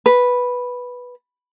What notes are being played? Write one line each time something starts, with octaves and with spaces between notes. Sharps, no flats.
B4